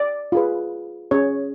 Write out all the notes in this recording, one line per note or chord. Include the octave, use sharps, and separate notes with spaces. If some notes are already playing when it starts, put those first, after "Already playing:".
Already playing: D5
F4 G#4 B4
C#4 G#4 C#5